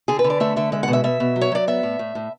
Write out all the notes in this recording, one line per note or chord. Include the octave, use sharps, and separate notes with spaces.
D3 G#4
B4
D3
D5
A3 E5
D3 E5
G#3 E5
F#5
B2
E5
B2 E5
B2
F#3
C#5
F#3 D5
B3 E5
A2
A2
A2